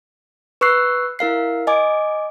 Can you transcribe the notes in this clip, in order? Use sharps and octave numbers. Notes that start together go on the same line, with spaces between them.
B4 C#6 E6 F#6 C7
E4 A#4 F5 C7
D#5 G#5 D6